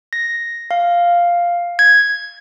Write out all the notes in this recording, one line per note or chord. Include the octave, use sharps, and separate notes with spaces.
A#6
F5
G#6